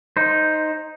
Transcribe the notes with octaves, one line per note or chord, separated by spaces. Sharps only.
D#4 C5